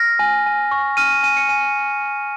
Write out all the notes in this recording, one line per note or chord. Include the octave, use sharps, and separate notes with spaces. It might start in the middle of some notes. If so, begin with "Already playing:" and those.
Already playing: F6 A#6
G#5
G#5
C#6
F6 D#7
D#7
G#5 D#7
C#7
G#5 D#7